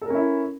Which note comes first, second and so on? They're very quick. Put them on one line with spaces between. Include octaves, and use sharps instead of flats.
A4 A#4 C#4 E4